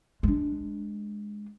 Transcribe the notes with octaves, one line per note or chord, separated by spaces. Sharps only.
G#3 D4